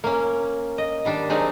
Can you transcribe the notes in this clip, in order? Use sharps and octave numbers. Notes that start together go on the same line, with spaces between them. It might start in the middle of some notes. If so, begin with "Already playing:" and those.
A#3 C#4
D#5
D#3 G3 D4
F#3 G#3 C4 D4 D#4